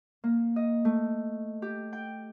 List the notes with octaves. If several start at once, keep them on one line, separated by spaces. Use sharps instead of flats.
A#3
D#5
A3
G4
G5